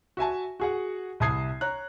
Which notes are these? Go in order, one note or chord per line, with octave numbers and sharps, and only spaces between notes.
F#4 E5 G#5 A5
F#4 G#4 F#5
C2 C3 A5 D#6 G#6 C7
C#5 A#5 F#6